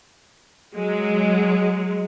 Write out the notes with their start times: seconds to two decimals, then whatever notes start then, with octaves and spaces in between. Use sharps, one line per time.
0.73 F#3 G#3